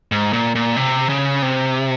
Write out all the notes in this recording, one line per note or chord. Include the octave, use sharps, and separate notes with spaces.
G#2
A#2
A#2
C3
C#3
C3